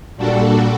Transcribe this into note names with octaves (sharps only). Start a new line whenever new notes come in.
A#2 G3 D4 F#4 A4